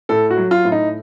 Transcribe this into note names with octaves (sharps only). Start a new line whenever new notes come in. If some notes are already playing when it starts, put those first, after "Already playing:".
A2 A4
F#4
F#3
F4
A2
D#4